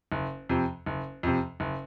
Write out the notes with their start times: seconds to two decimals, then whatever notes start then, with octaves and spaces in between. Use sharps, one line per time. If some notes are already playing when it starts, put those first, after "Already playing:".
0.12 F#1
0.49 F2 C3
0.86 F#1
1.23 F2 C3
1.60 F#1